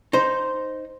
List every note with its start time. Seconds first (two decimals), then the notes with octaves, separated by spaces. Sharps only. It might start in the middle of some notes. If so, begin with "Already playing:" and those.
0.13 D#4 C5